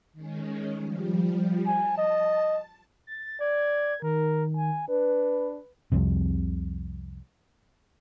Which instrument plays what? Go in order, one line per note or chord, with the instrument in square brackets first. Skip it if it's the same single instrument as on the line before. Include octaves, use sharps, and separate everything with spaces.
[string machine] D#3 G#3 C#4
F3 G3
[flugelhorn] G#5 [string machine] A5
[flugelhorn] D#5
[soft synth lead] A6
[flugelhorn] D5 [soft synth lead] G#6
[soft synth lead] D#3 [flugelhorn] A#4
[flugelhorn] G#5
[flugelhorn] D4 [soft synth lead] B4
[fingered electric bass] C2 F2 C3